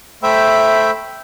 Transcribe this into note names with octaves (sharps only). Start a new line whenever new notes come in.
A3 C5 E5 G5 B5